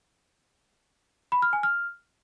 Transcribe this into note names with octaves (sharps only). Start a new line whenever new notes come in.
B5
F6
G#5
F6